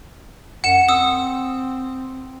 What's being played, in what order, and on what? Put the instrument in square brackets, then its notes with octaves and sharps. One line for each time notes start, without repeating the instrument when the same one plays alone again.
[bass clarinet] F#2 [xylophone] F#5 C#7 E7
[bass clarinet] C4 [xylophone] D#6 E6